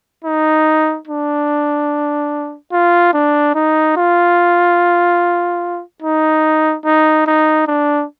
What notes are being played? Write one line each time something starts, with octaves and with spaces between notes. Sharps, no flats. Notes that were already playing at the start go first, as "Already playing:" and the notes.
D#4
D4
F4
D4
D#4
F4
D#4
D#4
D#4
D4